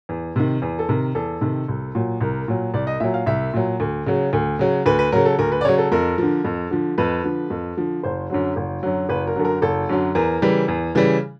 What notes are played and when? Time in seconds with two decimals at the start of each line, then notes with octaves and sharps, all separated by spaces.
0.09 E2
0.36 C3 D#3
0.62 E2
0.79 A4
0.89 C3 D#3 A#4
1.15 E2 A4
1.41 C3 D#3
1.68 C2
1.95 A#2 F#3
2.21 C2 A#4
2.48 A#2 F#3
2.74 C2 D5
2.87 D#5
3.00 A#2 F#3 E5
3.14 F5
3.26 C2 E5
3.54 A#2 F#3
3.80 D2
4.06 C#3 F#3
4.33 D2
4.59 C#3 F#3
4.86 D2 B4
4.99 B4
5.12 C#3 F#3 A#4
5.25 A4
5.39 D2 A#4
5.52 B4
5.61 D5
5.65 C#3 F#3 C#5
5.78 A4
5.92 F2 A#4
6.18 D3 F3
6.45 F2
6.71 D3 F3
6.98 F2 B4
7.24 D3 F3
7.50 F2
7.77 D3 F3
8.03 F#1 C5
8.30 F#2 D3 F#3
8.56 F#1
8.83 F#2 D3 F#3
9.09 F#1 B4
9.27 A#4
9.36 F#2 D3 F#3 A4
9.45 A#4
9.62 F#1 A4
9.89 F#2 D3 F#3
10.15 E2 A#4
10.42 C#3 E3 G3
10.68 E2
10.95 C#3 E3 G3